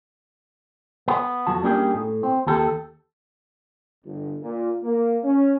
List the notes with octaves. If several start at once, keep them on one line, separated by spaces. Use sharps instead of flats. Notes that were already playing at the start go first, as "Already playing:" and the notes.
B3
F2 F#3 F#4 A5
G3 A#3 C#4 D4 G4 G#4
A2
C4
D#2 G4 A4
G1
A#2
A#3
C#4